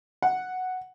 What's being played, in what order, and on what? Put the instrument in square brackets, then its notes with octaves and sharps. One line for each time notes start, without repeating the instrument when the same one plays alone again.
[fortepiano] F#5